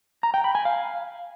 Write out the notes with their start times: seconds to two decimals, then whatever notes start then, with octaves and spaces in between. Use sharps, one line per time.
0.23 A#5
0.34 G5
0.44 B5
0.55 G#5
0.65 F5